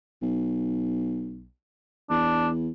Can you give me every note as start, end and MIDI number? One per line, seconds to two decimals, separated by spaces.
0.22 1.49 35
2.10 2.70 40
2.10 2.48 62